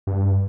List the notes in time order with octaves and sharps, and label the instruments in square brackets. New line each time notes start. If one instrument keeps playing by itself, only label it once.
[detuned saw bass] G2